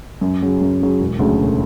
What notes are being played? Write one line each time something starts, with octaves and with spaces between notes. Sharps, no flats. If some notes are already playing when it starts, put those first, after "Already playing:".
F#2
C#3 F#3
F#2
C#3 F#3
E1
D2 C#3 F#3 A3
E1